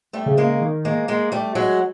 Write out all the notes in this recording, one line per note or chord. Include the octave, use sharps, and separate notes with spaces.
G3 A3
C#3
G#3 A#3
D#3
G#3 A#3
G#3 A#3
G3 A3
F#3 G#3